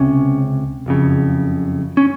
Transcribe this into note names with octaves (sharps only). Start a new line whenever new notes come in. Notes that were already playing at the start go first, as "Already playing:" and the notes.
Already playing: C#2 C3 C#4
F#1 F2 C#3
C#4